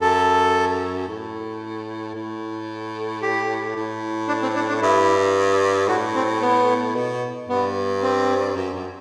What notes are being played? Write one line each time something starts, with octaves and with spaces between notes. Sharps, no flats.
F#2 A4
A2
A2
G4
A2
D4
C4
D4
D4
G2 E4
A2 F#4
C4
B3
B2
G2 B3
C4
F#2
F#2